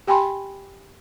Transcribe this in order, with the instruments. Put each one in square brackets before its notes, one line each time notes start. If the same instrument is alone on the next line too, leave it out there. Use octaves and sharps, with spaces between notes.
[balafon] G4 G5 G#5 B5 C6